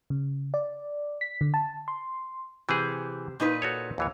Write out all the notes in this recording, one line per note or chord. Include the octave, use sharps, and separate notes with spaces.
C#3
D5
B6
D3
A5
C6
C3 E3 G#4
A#2 D#4 B4
F#4 A4 C#5
D#2 E3 C#5